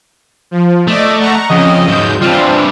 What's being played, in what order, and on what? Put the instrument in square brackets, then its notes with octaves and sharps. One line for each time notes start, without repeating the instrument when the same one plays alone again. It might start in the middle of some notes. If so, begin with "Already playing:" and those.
[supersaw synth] F3
[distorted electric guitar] A3 [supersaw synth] D5 D#5 D6
[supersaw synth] F#5 A#5 C#6
[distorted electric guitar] F2 [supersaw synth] C#3 [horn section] D#5
[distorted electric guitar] G#2 F#3 [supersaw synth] G6
[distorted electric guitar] E3 G3 [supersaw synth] C4 D4 [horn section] F4